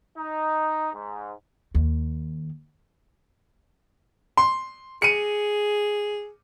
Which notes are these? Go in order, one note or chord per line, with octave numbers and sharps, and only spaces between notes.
D#4
G#2
D#2
C6
G#4 C#7 D#7